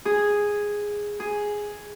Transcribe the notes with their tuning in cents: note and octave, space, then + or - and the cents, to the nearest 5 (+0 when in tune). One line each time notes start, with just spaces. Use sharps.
G#4 -5
G#4 +0